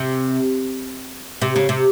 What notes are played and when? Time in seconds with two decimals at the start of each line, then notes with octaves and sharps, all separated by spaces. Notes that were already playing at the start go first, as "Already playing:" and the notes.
Already playing: C3
1.42 C3
1.56 C#3
1.69 C3